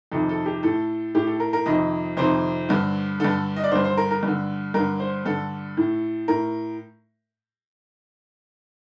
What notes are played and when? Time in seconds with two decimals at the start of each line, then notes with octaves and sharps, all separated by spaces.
0.12 F2 C3 D#3 A4
0.29 A4
0.46 G4
0.63 A2 A4
1.15 A2 G4
1.27 A4
1.40 A#4
1.53 A#4
1.66 F2 C3 D#3 D#5
2.17 F2 C3 D#3 C5
2.69 G2 D3
3.20 G2 D3 A4
3.56 D#5
3.64 D5
3.71 D3 C5
3.76 G2
3.84 C5
3.97 A#4
4.11 A#4
4.23 G2 D3
4.74 G2 D3 A#4
5.00 C5
5.25 G2 D3 A4
5.77 A2
6.28 A2 A#4